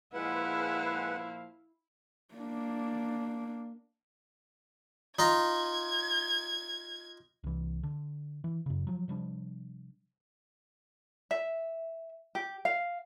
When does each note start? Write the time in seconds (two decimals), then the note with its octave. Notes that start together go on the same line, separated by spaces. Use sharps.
0.14 A#2 F3 G#3 E4 B4 F5 F#5
2.35 A#3 D4
5.19 D#4 F4 A#5 G#6
7.44 C2 E3
7.83 D3
8.44 E3
8.66 F#2 C#3
8.87 F3 F#3
9.08 C3 F3 G3 D4
11.31 E5
12.35 G4
12.65 F5